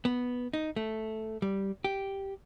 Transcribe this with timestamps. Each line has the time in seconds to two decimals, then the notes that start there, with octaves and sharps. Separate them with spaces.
0.05 B3
0.53 D#4
0.76 A3
1.42 G3
1.84 G4